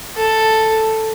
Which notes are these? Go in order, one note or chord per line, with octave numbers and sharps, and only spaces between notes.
A4